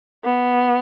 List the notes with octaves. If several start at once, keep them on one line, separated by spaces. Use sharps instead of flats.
B3